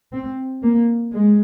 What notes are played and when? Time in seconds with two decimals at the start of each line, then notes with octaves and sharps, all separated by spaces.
0.12 C4
0.62 A#3
1.12 G#3